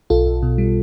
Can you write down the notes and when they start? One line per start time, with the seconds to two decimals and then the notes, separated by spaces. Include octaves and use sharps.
0.10 B1 F4 A4
0.27 B1
0.43 B2
0.58 G3